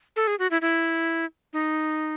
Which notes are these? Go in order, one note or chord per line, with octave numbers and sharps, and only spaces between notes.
A4
G#4
F#4
E4
E4
D#4